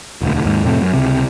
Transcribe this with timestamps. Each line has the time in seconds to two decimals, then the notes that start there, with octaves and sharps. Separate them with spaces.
0.21 E1 D2
0.44 D#2 G#2
0.64 F2 A2 C3 A3
0.82 F#2
0.93 C#2 C3